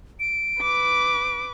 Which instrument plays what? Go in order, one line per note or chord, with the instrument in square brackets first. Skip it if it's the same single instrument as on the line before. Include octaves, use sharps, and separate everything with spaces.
[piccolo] D7
[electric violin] B4 D6